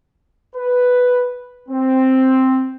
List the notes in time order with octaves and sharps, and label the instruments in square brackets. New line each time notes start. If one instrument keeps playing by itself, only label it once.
[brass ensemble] B4
C4